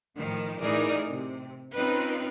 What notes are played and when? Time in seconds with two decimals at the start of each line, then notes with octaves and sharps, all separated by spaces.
0.17 A2 D#3 F3
0.61 A2 E3 D#4 G#4 A#4 D5
1.09 C3
1.75 C4 C#4 D#4 F4 B4